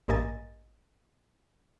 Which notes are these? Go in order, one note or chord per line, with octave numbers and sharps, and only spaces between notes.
A1 G2 A#3 D#5 G#5 A6